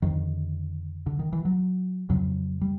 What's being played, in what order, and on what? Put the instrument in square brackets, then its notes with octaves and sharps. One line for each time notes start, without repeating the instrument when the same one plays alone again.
[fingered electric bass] F2 D3 D#3
D3
D#3
E3
F#3
F2 C#3 F#3
G3